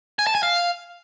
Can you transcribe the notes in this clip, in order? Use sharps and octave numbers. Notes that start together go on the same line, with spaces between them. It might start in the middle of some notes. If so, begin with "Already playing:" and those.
G#5
A5
G#5
F5